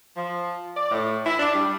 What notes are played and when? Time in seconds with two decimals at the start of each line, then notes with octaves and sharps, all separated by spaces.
0.17 F3
0.76 D5
0.91 A2
1.26 E4
1.39 D4
1.54 G3